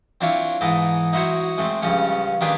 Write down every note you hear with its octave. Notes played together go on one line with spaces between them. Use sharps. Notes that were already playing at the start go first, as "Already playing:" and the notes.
C4 D4 E4 F4 C#5
G#2 E3 D#4 E4 D#5 A5
D#4 E4 F#4 C5 C#5
G#3 A3 C4
C#2 G2 C#3 F3 C#4
D#3 A#3 D4 G4 G#4 B4